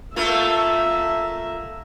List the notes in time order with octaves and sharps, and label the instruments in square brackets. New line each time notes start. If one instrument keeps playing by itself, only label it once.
[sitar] A3 A#3 F4 [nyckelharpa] E5